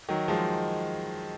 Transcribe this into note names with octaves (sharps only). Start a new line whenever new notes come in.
D#3 F#3
F3 G#3